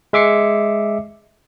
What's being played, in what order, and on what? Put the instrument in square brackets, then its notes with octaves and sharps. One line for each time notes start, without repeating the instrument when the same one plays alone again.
[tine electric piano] G#3 E5 D6 C7 C#7